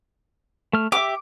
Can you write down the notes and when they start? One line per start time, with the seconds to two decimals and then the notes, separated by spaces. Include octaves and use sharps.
0.73 A3 F6
0.92 G4 E5 D6